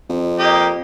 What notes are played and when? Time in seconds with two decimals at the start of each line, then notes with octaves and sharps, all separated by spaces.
0.10 F2
0.39 A#3 G4 D#5